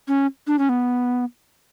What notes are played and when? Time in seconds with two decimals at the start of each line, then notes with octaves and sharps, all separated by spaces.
0.08 C#4
0.47 D4
0.59 C#4
0.69 B3